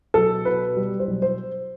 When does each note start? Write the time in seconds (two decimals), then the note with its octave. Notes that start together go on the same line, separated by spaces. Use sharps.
0.14 B1 A4
0.45 B2 B4
0.76 G3
1.00 C5
1.07 B1
1.22 C5